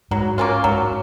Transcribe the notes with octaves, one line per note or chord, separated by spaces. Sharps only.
G#2 F#3
A#3 C#4 F4
G#2 F#3